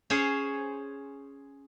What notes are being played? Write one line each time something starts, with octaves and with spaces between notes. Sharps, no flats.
C#4 G#4 C5 C#5